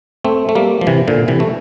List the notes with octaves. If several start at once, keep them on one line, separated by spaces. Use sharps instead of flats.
A3 C4
A3
G3 A#3
F3
C3 E3
A#2 D3
C3 E3
A3